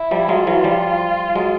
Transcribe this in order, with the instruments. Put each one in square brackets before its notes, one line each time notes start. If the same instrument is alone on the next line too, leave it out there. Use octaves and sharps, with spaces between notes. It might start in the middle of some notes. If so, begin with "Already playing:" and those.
Already playing: [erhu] E4
[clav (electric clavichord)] F3 G3
[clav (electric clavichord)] F#3 G#3 [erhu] F4
[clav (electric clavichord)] E3 F#3
F3 G3
F#3 G#3